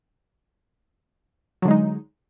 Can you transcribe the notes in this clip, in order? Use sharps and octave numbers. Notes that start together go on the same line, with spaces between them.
D3 F#3 G#3 D#4